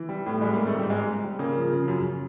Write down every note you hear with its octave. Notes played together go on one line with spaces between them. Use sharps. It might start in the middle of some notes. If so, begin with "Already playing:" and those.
Already playing: E3
G3
A2
G3 G#3
A#3
G#2
A3
G#2 G3
G#2 G#3
G#2
G3
C#3 A#3
F3
C#3
F#2